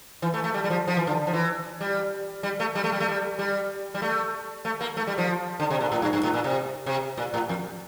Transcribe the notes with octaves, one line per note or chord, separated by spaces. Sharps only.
E3
A3
A3
G3
G3
F3
F3
E3
D3
F3
E3
G3
G3
A3
G3
A3
G3
A3
G3
G3
G3
A3
A3
A#3
A3
G3
F3
D3
C3
A#2
A2
G2
G2
A2
A#2
C3
C3
A#2
A2
F2